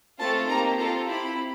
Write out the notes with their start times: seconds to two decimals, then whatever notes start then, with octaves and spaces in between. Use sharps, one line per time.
0.19 A3 C4 F4 A4 A5
0.49 A#3 D#4 G4 A#5
0.79 C4 F4 A4 A#5
1.08 C4 E4 G4 B5